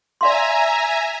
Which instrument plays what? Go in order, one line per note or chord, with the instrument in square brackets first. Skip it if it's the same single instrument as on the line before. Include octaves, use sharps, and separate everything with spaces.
[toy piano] D5 F5 C6 [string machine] E5 G#5 A#5